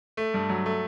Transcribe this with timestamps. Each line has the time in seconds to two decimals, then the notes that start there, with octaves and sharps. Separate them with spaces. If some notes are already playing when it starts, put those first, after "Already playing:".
0.17 A3
0.34 G2
0.49 F#3
0.66 A3